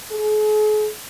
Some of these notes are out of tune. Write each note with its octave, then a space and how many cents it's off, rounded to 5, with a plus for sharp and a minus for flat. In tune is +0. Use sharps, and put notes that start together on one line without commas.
G#4 +45